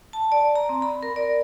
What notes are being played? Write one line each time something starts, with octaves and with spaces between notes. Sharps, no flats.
A5
D5
A#5
C4
B5
A#4
D5